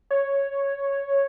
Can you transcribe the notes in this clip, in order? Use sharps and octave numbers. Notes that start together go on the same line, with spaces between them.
C#5